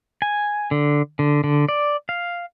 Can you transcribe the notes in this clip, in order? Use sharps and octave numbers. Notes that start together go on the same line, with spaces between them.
G#5
D3
D3
D3
D5
F5